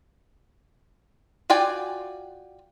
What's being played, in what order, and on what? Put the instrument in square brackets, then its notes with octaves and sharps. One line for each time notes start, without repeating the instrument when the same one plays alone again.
[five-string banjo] F4 F#4 D5 G5 G#5